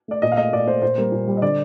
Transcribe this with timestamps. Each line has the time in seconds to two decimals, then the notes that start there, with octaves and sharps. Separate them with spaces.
0.08 A3 D5
0.22 A#2 D#5
0.32 F5
0.37 A3 D#5
0.53 A#2 D5
0.67 A3 C5
0.82 A#2 C5
0.98 G3 A#3
1.12 A#2
1.28 G3 A#3
1.37 D#5
1.42 D3 D5